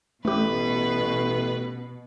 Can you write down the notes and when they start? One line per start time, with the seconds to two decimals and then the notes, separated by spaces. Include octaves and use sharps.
0.25 A1 B2 A3 G4 B4